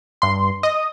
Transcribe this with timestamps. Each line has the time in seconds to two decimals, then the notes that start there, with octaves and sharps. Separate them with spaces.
0.22 G2 C6
0.63 D#5 D#6